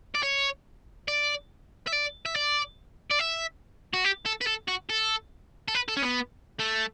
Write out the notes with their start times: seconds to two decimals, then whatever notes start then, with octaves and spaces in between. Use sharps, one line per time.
0.15 D5
0.23 C#5
1.08 D5
1.87 E5
1.93 D5
2.26 E5
2.36 D5
3.11 D5
3.20 E5
3.93 F#4
4.04 G4
4.26 A4
4.41 B4
4.47 A4
4.68 F#4
4.89 A4
5.68 A4
5.74 B4
5.88 A4
5.97 C#4
6.02 B3
6.59 A3